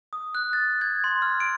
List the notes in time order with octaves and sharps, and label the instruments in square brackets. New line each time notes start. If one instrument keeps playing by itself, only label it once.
[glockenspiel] D#6
F#6
A6
G#6
C6
F6
D7